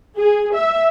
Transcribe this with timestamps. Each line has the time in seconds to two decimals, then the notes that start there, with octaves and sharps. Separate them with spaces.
0.17 G#4
0.55 E5